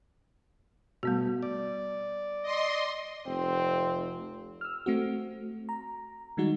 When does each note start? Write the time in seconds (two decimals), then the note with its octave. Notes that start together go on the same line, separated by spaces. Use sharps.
1.03 B2 G3 A3 B3 F#4
1.43 D5
2.43 D#5 C6
3.27 F1 C4
4.61 E6 F6
4.86 A3 C4 F#4
5.69 A#5
6.37 D#3 G3 G#3 D#4 F#4